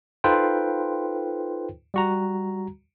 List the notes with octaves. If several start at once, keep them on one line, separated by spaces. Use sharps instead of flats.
D#4 F4 A4 B4 C5 G5
G3 F#4 A#5